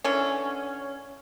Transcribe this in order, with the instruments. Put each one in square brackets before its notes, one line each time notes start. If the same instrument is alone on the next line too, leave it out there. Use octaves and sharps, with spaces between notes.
[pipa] D3 E3 C#4